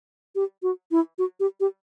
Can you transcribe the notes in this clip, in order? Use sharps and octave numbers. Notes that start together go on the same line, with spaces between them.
G4
F#4
E4
F#4
G4
G4